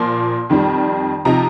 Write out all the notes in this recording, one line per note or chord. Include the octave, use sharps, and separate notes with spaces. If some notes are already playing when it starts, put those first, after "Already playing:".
Already playing: A#2 F3 A#3 C6
F2 D#3 G3
C3 F3 D#4 A#5